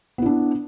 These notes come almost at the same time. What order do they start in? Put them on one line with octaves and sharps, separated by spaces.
B3 E4 D4